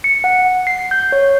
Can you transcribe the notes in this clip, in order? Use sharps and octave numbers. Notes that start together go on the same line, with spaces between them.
C#7
F#5
C7
G6
C#5